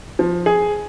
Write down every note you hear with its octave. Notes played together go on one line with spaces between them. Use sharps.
F3
G#4